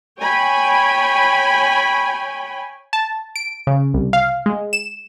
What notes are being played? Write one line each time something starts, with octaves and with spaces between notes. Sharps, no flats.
C#5 G5 G#5 B5
A5
D7
C#3
C2
F5
G#3
E7